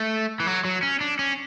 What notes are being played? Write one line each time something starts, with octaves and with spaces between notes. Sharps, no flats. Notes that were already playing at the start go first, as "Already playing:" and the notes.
Already playing: A3
E3
F#3
F#3
C#4
D4
C#4